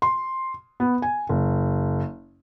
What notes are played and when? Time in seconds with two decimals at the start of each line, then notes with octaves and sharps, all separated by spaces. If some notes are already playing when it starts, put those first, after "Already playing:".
0.02 C6
0.80 B3
1.02 G#5
1.29 F#1